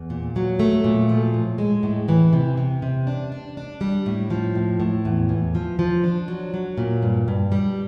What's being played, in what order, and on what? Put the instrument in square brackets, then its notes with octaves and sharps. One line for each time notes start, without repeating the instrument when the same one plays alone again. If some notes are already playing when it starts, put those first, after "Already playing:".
Already playing: [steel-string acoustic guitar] E2
A#2
F#3
A3
A#2
F3
A2
G#3
A2
E3
C3
C3
C3
D4
D4
D4
G3
A2
F3
A2
A2
E2
E2
F3
F3
D4
F#3
F#3
A#2
G2
G2
G3